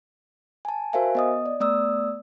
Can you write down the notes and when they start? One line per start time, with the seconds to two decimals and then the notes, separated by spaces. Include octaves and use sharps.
0.65 G#5 A5
0.93 F#4 A#4 C5 E5 F5 G#5
1.15 B3 D#5 D#6
1.46 D5
1.60 A3 B3 D5 D#6 E6